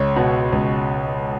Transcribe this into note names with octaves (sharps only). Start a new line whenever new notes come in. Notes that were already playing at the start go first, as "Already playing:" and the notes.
Already playing: C#2 C#5
B2
C#2